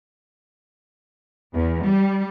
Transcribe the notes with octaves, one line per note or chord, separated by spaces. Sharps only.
E2
G3